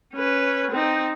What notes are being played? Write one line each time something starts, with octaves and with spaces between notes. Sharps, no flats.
C#4 B4
C4 D#4